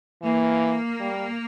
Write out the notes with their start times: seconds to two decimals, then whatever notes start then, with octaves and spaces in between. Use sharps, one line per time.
0.23 E3 A#3
1.00 G3